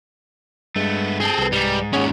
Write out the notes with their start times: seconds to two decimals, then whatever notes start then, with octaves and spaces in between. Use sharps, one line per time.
0.76 G2 G#3 A3 B3
1.20 C4 G#4 A4
1.38 C2 B4
1.52 G#2 G3
1.93 D#2 C#4 G#4 C#5 F#5